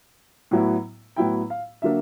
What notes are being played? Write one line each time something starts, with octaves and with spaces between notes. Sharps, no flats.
A2 F#3 B3 E4
A2 F#3 B3 E4 G5
F5
D3 F#3 A#3 D4 E5